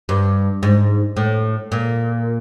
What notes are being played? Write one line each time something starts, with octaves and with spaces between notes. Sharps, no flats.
G2
G#2
A2
A#2